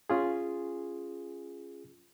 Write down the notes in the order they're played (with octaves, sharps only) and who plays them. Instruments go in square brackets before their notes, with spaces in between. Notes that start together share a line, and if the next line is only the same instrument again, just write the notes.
[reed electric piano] C#4 F4 G#4